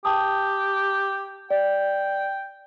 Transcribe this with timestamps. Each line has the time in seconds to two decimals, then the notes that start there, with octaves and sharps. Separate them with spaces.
0.05 G4 G5 A5 D#6
1.50 D5 G5